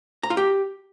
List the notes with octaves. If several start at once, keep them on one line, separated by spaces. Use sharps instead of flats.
A#5
F4
G4